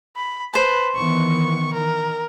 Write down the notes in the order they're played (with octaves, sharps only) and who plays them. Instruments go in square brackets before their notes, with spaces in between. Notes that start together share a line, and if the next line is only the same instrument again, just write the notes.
[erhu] B5
[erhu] B4 [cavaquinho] C5 A5
[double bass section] D#3 E3 B3 [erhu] C#6
[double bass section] D#3 [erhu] A#4